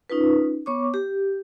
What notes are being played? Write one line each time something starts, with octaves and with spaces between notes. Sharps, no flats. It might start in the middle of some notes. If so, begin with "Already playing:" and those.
C#4 D#4 F4 B4
B3 C#5 C#6 D6
G4